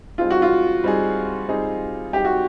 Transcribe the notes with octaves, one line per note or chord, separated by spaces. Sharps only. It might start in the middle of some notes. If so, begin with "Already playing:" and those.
G3 C4 D#4 F4 G#4
F#4
F4
G3 C4 D#4 G#4
G3 C4 D#4 G#4
G3 C4 D#4 G4 G#4
F#4